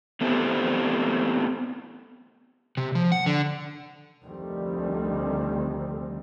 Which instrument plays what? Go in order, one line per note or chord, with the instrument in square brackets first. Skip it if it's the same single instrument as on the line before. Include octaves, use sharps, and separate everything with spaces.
[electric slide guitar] A3 B3 C4 E4 G4 A4
C3
F3
F#5
D3
[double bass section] F1 D2 D#3 G3 A3 C4